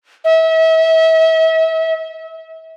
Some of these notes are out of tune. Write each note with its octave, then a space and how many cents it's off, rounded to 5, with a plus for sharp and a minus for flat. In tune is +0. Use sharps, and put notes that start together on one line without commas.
E5 -35